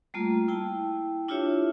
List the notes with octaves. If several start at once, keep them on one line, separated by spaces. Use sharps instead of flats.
G3 A3 A#3 F4
E4 G5 A5
D4 E4 F4 G4 C#5 E5